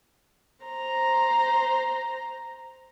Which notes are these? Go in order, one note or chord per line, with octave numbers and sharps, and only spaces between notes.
C5 A#5